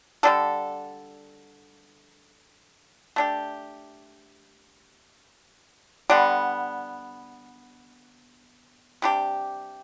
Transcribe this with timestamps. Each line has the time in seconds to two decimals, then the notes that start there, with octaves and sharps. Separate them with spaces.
0.23 D3 G3 D4 A4
3.16 A3 D4 G4
6.10 D3 G3 B3
9.02 C3 G3 D4 G4